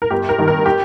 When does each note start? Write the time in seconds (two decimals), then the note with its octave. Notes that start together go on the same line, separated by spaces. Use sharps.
0.02 A#4
0.10 G1 G4
0.29 A#4
0.38 G2 D#3
0.48 A#4
0.66 G4